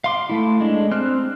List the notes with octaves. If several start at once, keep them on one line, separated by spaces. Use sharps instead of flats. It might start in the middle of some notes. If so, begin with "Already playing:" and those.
F5 C6 D6
A3 E4
G#3 D4
C4 F6 F#6